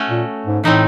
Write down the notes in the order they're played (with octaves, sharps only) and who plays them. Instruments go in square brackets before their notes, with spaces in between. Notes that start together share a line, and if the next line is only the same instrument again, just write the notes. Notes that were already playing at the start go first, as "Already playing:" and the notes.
Already playing: [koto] A3 C#4 F#4
[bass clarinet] A#2
G#2
[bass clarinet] A2 [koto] E3 A3 C4 D#4